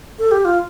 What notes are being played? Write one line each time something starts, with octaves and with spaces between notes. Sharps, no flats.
A4
G4
F4